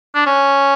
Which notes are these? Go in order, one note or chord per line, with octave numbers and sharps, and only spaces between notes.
D4
C#4